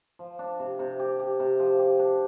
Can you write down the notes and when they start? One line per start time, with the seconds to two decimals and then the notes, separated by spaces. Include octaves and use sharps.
0.19 F3
0.39 D4
0.59 C3
0.79 C3
0.99 G4
1.20 G4
1.40 C3
1.60 F3
1.79 G4
1.99 D4